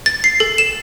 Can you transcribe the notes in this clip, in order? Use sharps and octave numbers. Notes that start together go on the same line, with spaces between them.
A6
C7
A4
E7